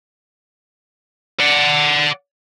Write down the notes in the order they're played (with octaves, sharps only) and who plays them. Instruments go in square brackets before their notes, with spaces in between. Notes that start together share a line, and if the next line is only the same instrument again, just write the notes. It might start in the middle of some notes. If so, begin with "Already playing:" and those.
[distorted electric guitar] D5 F#5